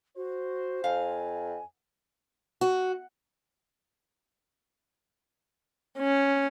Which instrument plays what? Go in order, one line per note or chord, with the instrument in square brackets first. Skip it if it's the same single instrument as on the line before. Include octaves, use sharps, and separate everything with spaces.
[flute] F#4 [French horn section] C5
[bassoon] F2 [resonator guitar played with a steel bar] F5 [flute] G#5
[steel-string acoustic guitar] F#4
[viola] C#4